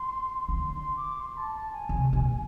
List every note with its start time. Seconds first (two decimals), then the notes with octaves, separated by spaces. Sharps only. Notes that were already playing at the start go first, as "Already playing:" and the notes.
Already playing: C6
0.49 D3 C6
0.72 C6
0.96 D6
1.19 C6
1.36 A5
1.54 A5
1.72 G#5
1.89 C3
2.13 B2